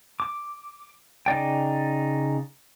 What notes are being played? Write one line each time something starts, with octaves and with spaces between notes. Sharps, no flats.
D6
C#3 D#4 D5 G5